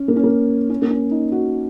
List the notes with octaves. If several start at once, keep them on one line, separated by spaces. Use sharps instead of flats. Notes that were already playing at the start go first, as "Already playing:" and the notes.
Already playing: C#4
A#3
C#4
A#3
C#4
A#3
C#4
D#4
F#4